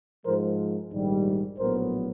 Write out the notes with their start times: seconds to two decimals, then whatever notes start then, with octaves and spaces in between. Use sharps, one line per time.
0.25 G#2 F3 G#3 A#4 C5
0.92 A#1 G#2 D#3 G3
1.58 A#1 A2 F#3 B3 A#4 C5